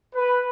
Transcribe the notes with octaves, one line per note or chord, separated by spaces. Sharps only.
B4